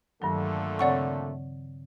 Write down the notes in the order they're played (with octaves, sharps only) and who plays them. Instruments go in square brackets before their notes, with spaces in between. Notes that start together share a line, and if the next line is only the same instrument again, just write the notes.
[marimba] G2 D#3 F#3 [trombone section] A#2 D3 A3
[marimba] C#3 C4 C#5 [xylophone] D5 F#5 C#6